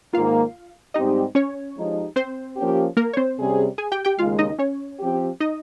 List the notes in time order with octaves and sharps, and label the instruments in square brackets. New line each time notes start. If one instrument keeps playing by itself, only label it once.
[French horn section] G#2 D#3 A#3 [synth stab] F4 F5
[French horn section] G#2 G3 C4 G4 [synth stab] D#4 D#5
[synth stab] C#4 C#5
[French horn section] F3 G#3 D#4 G4
[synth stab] C4 C5
[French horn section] F3 A#3 C#4 G4
[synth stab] A#3 A#4
C#5
C4 C5
[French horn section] C3 G3 C#4 G#4
[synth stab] G#4 G#5
G4 G5
G4 G5
[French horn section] D#2 C#3 G#3 [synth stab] F4 F5
[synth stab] D#4 D#5
C#4 C#5
[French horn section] F3 C4 G4
[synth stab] D#4 D#5